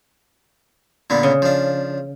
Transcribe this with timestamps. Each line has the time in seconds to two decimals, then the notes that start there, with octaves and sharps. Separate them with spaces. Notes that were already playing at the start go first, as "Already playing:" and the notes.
1.10 A#2 D3 B3
1.23 C#3
1.42 F3 D4